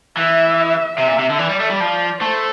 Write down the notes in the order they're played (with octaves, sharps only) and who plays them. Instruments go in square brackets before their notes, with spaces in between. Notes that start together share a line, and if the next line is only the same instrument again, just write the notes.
[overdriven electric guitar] E3 [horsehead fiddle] E5
[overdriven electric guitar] C3 [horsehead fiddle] E5
[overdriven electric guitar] A#2
C3
D3
[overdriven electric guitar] E3 [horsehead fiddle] D5
[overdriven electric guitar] G3
A3
G3
F3
[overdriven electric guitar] A3 [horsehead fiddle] C5